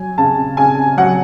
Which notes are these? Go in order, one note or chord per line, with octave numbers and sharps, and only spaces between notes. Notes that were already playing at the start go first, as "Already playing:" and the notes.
Already playing: F#3 G#5
C#3 A5
C#3 G#5
F#3 F#5